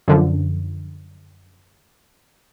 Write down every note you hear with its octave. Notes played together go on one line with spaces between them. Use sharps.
F#2 D3 F3